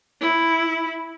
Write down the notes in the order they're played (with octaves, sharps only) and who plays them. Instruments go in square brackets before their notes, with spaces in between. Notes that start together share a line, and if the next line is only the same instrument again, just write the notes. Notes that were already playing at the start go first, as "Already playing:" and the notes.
[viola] E4